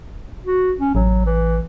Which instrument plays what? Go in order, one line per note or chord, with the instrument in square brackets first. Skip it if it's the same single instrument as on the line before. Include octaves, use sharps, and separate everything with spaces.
[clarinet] F#4
C#4
[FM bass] A1 [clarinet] F#3
[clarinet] E3